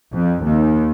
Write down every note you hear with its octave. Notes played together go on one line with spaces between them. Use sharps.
F2
D#2